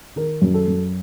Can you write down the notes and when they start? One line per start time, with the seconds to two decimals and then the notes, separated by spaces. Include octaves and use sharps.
0.16 D#3 A#4
0.42 F#2
0.54 A4
0.68 F#2